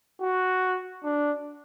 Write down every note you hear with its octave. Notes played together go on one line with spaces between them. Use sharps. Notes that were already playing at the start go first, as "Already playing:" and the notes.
F#4
D4